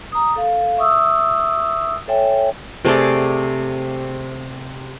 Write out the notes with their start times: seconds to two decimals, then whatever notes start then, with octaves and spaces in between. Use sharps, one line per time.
0.12 A#5 D#6
0.36 A4 F5
0.77 E5 C#6 D#6 E6
2.08 A4 C#5 E5 G5 G#5
2.85 C3 A3 G#4 D5